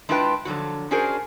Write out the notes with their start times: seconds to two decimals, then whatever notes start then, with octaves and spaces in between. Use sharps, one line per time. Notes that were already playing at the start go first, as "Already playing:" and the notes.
0.09 G#3 D4 E4 F4 B4 G5
0.45 D3 F3 F#3 F#4
0.91 C#4 D4 F#4 G#4 A#4 C5